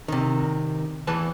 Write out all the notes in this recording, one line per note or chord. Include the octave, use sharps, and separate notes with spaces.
C3 D#3
E2 E3 B4 A5